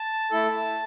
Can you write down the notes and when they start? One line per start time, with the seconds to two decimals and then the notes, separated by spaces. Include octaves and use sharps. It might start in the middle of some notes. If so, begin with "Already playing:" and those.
Already playing: A5
0.31 A3 E4 A4